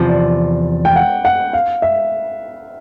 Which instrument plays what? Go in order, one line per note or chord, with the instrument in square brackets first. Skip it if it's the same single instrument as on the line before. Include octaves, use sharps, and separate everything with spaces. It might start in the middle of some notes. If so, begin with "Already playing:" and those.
Already playing: [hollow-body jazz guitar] E2 C3 F3
[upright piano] D5
G5
F#5
F#5
F5
E5